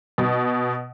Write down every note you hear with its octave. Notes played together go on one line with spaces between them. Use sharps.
B2